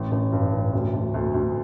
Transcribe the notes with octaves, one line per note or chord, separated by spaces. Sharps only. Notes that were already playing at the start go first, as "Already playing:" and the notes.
Already playing: A1
A1
G2
A1
D2
D2
D2
D2